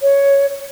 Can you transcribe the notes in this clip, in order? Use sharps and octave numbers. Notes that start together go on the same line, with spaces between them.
C#5